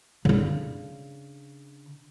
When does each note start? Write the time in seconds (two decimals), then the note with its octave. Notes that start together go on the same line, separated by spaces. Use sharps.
0.25 C#3 D4